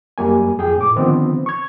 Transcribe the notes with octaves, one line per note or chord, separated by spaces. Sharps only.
F#2 G3 A#3 G#5
F2 G#4 G5
A2 D6
D3 D#3 F3 B3 C4
C#6 G#6